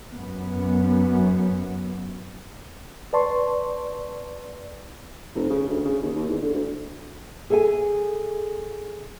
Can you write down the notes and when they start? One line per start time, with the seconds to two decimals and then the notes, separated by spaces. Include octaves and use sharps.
0.14 F#2 B3
3.13 B4 D5 A5 C6 C#6
5.35 F1
5.50 C#3
5.68 D2
5.85 C#3
6.02 D#2
6.15 D#2
6.29 E2
6.41 D3
6.53 D2
7.50 G#4 A4 E5 F5 G#5